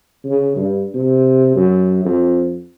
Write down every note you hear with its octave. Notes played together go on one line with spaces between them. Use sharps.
C#3
G2
C3
F#2
F2